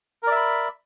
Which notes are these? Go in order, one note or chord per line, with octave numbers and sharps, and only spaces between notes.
A#4 D5 E5 B5